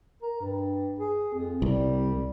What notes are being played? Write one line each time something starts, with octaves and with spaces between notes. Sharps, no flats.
A#4
G2
G#4
F2
C2 G3